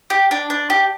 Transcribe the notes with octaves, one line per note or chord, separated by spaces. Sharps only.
G4
D4
D4
G4